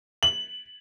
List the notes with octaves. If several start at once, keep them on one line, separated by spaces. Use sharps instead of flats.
F#7